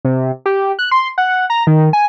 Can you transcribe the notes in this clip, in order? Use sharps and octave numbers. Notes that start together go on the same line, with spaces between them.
C3
G4
F#6
C6
F#5
A#5
D#3
G#5